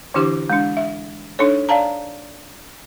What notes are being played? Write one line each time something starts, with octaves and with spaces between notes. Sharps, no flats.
D3 E3 D4 E4 G4 D6
G#3 D4
E5
D4 D#4 A4 C#5
D5 F5 A5 A#5